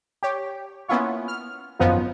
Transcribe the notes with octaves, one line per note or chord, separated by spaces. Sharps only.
G4 C#5
A#3 B3 C#4 E4 F4 C#5
F6
G#1 F#2 F3 B3 D#4 F4